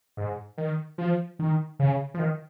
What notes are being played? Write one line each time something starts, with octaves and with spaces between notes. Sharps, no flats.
G#2
D#3
F3
D#3
C#3
F3
D#3